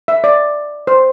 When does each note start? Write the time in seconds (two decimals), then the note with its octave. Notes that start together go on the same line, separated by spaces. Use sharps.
0.08 E5
0.24 D5
0.87 C5